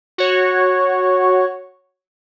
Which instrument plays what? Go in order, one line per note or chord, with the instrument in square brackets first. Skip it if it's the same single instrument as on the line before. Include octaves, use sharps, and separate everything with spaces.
[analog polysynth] F#4 C#5